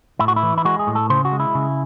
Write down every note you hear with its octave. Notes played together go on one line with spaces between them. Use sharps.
A2 E4
F#4
E4
E3
E4
G#3 F#4
G#4
A2
A4
C#3 C5
F#4
G#3
E4
C#3